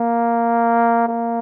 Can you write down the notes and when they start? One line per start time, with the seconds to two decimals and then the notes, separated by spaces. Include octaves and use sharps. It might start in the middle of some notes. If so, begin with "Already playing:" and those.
Already playing: A#3
1.08 A#3